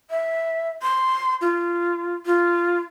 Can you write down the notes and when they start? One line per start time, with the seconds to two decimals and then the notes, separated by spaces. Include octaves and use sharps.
0.10 E5
0.82 C6
1.41 F4
2.26 F4